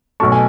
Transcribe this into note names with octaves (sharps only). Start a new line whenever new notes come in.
B1 B2 A3 A5 C#6
G#5